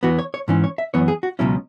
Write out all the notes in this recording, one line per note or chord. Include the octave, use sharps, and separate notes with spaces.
E2 E3 B3 F#4
C#5
C#5
G#2 E3 C#4
C#5
E5
F#2 E3 B3 C#5
G#4
F#4
C#2 B2 F#3 C#4 E4